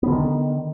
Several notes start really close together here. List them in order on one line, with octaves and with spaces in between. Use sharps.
B3 D3 D#3